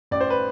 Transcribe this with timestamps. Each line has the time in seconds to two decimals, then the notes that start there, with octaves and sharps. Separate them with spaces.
0.11 A1 D5
0.21 C5
0.30 B4